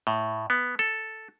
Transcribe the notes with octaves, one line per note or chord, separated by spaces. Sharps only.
A2
B3
A4